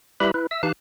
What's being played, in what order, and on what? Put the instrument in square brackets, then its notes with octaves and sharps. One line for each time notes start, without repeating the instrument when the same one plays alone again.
[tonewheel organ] G3 E4 G4 B4 E5 B5
E4 B4
E5 E6
E3 D#4 G4 F5 A5 F#6